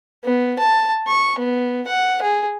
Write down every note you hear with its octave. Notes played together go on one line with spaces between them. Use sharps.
B3
A5
C#6
B3
F#5
G#4